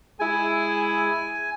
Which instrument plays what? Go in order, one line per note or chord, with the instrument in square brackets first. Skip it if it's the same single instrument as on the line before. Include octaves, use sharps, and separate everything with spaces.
[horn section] G#3 E4 G#4 [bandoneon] G#5